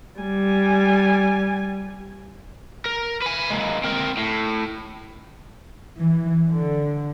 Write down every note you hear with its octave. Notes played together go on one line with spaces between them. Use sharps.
G3 G#5
A#4
B4 G#5
G#3 A#3
C4 A#4
A2
E3
D3